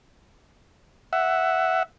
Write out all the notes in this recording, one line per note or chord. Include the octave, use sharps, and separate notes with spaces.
E5 F#5